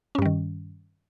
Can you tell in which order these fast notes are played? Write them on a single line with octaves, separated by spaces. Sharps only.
C#4 G2 G3 D#3